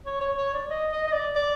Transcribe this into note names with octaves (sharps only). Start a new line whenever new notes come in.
C#5
C#5
C#5
D5
D#5
D#5
D#5
D5
D5